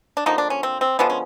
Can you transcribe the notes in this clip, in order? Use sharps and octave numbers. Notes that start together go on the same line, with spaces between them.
D4
D3 F3 A#3 D#4
D4
C#4
C4
C4
D3 F3 G#3 B3 D4
C#4